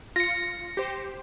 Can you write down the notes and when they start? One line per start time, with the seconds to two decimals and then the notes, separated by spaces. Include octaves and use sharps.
0.16 F4 A#6 C#7
0.77 G4 C5